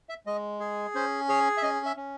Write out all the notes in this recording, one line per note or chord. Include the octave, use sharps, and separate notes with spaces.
E5
G#3 D#5
G#4
C#4 C5
G#4 C#5
E5
C#4 D#5
E5
C#4